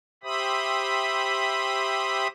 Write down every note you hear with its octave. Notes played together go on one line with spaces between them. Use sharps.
G4 C5 E5 B5 D#6